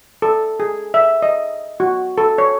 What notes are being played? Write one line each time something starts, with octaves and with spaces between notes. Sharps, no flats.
A4
G#4
E5
D#5
F#4
A4
C#5